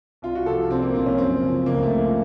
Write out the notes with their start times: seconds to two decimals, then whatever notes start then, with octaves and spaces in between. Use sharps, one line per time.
0.22 C2 F4
0.35 F#4
0.46 C3 F3 A4
0.70 C2 C4
0.82 A#3
0.94 A#2 F3 C4
1.06 C#4
1.18 F#2 C4
1.42 C#3 F3
1.66 C#2 A#3
1.83 A3
1.90 C#3 F3
1.98 A#3